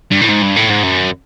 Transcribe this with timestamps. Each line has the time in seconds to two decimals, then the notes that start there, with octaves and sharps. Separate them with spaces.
0.12 G2
0.21 A2
0.29 G#2
0.43 G2
0.56 A2
0.70 G#2
0.83 F#2